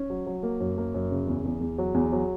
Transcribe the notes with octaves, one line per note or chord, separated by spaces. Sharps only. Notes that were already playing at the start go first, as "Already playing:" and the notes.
Already playing: C#4
F#3
F#3
A#3
F#2
A#3
F#2
C#3
E2
E2
E2
F#3
E2
F#3